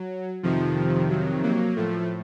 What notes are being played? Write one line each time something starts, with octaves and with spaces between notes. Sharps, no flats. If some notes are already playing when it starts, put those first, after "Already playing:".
Already playing: F#3
F2 C3 D#3 F3
F#3
F#3 A#3
A2 F3 A3